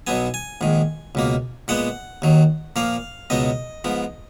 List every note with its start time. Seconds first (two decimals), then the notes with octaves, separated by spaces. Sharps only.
0.07 B1 B2 F#3 B3 G#5
0.34 G#5
0.61 A#1 G#2 D#3
1.15 C#2 B2 A#3
1.68 A#2 G#3 B3 F#5
2.22 D#2 D#3 F#3
2.76 A#2 F3 A#3 F5
3.30 C#2 B2 F#3 B3 D#5
3.84 G#2 F3 B3